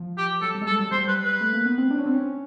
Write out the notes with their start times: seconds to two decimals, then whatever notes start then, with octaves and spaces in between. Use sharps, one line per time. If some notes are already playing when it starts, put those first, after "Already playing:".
Already playing: F3
0.18 G4
0.42 F#3 A4
0.55 G3
0.61 G#3
0.67 G3 A4
0.79 F#3
0.91 G3 C5
1.08 B4
1.24 B4
1.41 A3
1.53 A#3
1.65 B3
1.78 C4
1.90 D4
1.98 C#4
2.06 C4
2.14 C#4